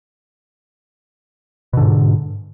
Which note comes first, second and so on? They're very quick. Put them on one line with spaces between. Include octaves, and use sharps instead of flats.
B2 D3 G#2